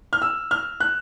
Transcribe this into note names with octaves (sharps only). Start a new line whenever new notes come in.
F6
E6
F6
F#6